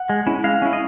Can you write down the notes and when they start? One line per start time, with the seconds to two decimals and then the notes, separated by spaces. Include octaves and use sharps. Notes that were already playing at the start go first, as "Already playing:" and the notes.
Already playing: F#5
0.10 G#3
0.27 C#4 E4
0.44 G#3 F5
0.62 C#4 E4
0.73 D#5